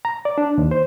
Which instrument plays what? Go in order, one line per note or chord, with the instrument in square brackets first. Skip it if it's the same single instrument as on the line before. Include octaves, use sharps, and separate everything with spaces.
[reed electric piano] A#5
D5
D4
D#2
C5